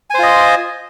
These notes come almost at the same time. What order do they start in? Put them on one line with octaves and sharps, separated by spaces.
G#5 C5 F4 D#5